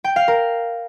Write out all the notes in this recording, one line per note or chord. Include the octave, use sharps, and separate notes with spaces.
G5
F5
A#4